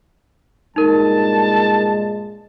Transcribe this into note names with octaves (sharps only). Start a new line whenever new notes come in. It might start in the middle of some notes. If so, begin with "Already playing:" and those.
G2 A#2 G#3 D#4 A#4 A5